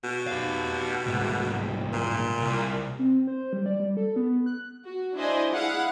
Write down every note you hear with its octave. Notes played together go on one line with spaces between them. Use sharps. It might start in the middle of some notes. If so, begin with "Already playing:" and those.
B2
G4 F5
C2 G#2
A#2
C2
C4
C5
G3
D5
G3
A4
B3
F#6
F#4
D4 E4 C5 D5 D#5 G#5
E4 G#4 F5 F#5